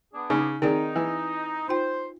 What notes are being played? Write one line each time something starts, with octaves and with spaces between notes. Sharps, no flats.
B3 D4 G#4
C#3 D#4
D#3 C4 D#4 G#4 D5
E3
D#4 F4 C5 G5